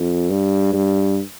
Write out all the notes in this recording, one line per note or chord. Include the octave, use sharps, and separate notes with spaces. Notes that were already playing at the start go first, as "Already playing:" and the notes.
Already playing: F2
G2
G2